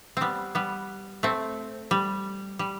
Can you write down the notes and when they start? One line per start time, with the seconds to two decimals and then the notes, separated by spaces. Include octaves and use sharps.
0.17 G3 B3 C4
0.55 G3 B3
1.23 A3 C4
1.91 G3
2.59 G3